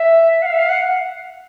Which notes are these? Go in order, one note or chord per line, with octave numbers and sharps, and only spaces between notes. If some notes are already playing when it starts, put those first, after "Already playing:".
Already playing: E5
F#5
F5
E5
F5
F#5